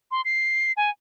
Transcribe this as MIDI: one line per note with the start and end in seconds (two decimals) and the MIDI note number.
0.11 0.21 84
0.25 0.72 96
0.77 0.90 80